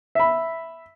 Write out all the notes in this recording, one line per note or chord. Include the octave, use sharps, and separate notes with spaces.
E5 B5